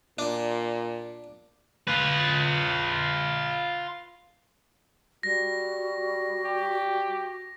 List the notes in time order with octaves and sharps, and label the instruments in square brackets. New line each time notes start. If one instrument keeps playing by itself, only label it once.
[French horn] A#2 [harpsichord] D4
[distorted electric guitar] F4 B4
[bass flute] G3 [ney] F#4 [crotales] A#6
[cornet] G4